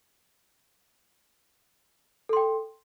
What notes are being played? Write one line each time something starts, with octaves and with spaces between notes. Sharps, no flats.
A4 G5 C6